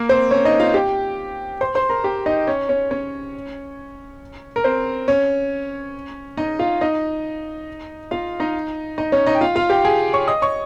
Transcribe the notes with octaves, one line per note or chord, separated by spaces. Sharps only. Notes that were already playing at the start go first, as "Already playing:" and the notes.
Already playing: A#3 A#4
C4 C5
C#4 C#5
D#4 D#5
F4 F5
G4 G5
C5 C6
C5 C6
A#4 A#5
G4 G5
D#4 D#5
C#4 C#5
C#4 C#5
C#4 C#5
A#4
C4 C5
C#4 C#5
D#4 D#5
F4 F5
D#4 D#5
F4 F5
D#4 D#5
D#4 D#5
C#4 C#5
D#4 D#5
G5
F4 F5
F4 F5
G4 G5
G#4 G#5
C#5 C#6
D#5 D#6
C#5 C#6